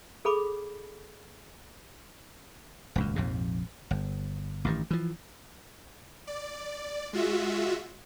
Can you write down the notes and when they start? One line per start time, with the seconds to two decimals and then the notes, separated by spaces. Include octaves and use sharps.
0.25 G#4 A4 B5 D6
2.96 D#1 C#2 F#2
3.16 A#1 F2 G#2 C3
3.91 G1
4.65 A1 G2 D#3
4.91 E3 F3
6.27 D5
7.13 G#3 F4 F#4 E5